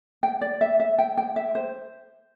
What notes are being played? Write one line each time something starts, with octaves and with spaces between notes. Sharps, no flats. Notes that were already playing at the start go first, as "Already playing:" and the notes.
G5
D5
E5
E5
G5
G5
E5
C5